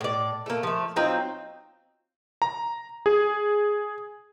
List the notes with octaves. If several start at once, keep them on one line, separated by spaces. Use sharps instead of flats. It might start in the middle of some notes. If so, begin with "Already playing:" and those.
A2 D5
A3 A#3
F3 A3
F#3 C4 D#4 F4
A#5
G#4